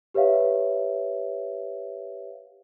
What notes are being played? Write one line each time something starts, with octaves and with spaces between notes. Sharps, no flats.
G4 B4 C#5 E5 F5